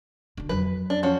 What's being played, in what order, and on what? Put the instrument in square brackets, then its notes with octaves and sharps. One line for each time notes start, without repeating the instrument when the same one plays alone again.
[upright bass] D3 D4
[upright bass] F2 F#3 [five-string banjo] B4
[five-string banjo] D4
F3 C#4 F#4